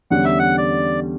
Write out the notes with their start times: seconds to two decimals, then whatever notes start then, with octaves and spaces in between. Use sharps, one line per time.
0.11 E2 D3 G3 C#4 F#5
0.25 E5
0.39 F#5
0.58 D5